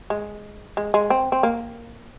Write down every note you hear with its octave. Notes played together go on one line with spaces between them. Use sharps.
G#3
G#3
G#3
C4
C4
A#3